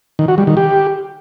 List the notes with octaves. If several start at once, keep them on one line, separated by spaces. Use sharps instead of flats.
D#3
F#4
G3
D#3
G4